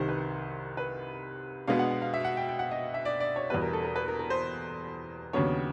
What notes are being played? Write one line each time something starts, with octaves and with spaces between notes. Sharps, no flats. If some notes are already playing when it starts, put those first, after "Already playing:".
Already playing: C2 C3 D#3 C5
B4
B4
B2 G#3 B3 D4 F5
F#5
F#5
F5
E5
F#5
G5
G5
F#5
D#5
E5
D5
D5
C#5
E2 B2 G3 B4
A#4
A4
A#4
B4
A#4
A#4
C5
D#2 C#3 F#3 B3 D4 C#5